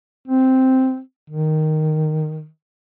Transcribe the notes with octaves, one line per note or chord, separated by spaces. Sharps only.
C4
D#3